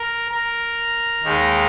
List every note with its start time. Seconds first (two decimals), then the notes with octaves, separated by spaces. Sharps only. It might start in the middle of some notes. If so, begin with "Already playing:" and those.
Already playing: A#4
0.31 A#4
1.23 D#2 D#3 G#3